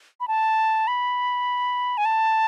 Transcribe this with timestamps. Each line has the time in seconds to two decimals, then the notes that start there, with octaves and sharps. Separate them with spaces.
0.20 B5
0.28 A5
0.87 B5
1.97 G#5
2.05 A5